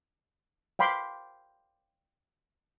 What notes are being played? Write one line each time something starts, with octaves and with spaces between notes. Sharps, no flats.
F5 G5 B5 C6 D6